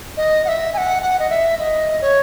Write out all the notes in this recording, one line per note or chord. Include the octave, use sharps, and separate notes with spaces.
D#5
F#5
E5
G#5
F#5
F#5
D#5
E5
D#5
C#5